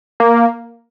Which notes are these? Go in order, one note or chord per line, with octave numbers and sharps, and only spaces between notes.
A#3